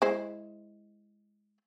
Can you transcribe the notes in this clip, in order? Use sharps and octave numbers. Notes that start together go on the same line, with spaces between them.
G#3 E4 C5